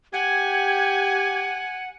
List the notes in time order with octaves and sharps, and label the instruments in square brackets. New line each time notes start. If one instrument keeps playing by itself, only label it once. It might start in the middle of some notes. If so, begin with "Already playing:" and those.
[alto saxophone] G4 [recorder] F#5 [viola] G#5 [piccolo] G#6